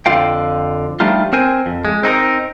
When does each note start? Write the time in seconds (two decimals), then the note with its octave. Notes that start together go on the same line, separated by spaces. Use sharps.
0.06 F2 D3 F4 F5 G5
1.00 F3 G3 A3 D4 D#4 F4
1.33 C4 A#4 C5 G#5
1.66 F2
1.85 G#3
2.03 C4 D#4 F#4 A#4